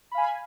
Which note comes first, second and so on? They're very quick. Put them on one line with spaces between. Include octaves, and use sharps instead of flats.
B5 F5 G#5